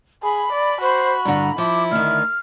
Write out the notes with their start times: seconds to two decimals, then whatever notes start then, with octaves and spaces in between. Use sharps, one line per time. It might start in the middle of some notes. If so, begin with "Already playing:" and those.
0.23 G#4 B5
0.52 D5
0.82 F#4 C5
1.25 G2 D3 A#5
1.58 F3 E4 D6
1.91 D2 D#3 F6